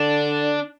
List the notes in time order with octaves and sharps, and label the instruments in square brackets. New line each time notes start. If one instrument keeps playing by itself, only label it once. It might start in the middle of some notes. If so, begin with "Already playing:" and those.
Already playing: [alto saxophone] D3 [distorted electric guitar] D4